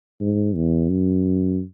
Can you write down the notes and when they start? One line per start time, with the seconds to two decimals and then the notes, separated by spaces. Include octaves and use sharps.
0.21 G#2
0.56 E2
0.90 F#2